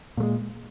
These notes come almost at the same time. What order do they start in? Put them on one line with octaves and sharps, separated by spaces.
A#2 A3 G#3